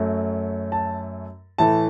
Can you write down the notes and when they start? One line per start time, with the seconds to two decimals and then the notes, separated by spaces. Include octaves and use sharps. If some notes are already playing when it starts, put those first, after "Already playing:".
Already playing: F#2 F#3 A3
0.72 A5
1.58 A2 E3 A3 A5